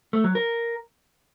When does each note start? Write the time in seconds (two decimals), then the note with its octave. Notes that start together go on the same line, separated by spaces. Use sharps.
0.13 A3
0.24 F#3
0.35 A#4